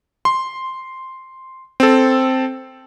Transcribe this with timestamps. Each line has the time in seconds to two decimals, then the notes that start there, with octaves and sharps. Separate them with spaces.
0.25 C6
1.80 C4 A4